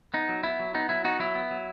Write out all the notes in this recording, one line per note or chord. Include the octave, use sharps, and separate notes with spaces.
B3 D#4
F#3
B3 E4
F#3
B3 D#4
F#3 E4
B3 D#4 F#4
F#3 E4
B3
F#3